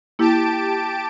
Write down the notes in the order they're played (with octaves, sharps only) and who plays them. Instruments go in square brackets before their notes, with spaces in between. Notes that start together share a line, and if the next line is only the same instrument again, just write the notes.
[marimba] A#3 E4 [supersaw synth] G4 A5 D7